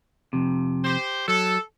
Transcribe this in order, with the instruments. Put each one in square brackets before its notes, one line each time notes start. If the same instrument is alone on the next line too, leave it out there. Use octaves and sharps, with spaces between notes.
[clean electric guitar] F2 C3
[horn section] G4 C5
[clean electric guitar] F#3 [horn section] A4